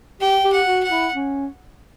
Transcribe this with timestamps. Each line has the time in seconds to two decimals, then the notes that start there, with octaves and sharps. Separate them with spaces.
0.21 G4 G5
0.44 G4
0.53 F#5
0.68 F#4
0.84 F#5
0.91 E4
1.14 C#4